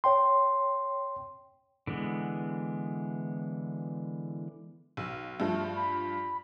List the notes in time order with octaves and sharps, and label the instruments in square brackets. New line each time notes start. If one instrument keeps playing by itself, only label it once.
[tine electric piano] C#5 G5 C6
[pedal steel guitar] D3 E3 G#3 B3
[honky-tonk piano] B1
[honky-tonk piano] G2 F3 [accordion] A3
[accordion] B5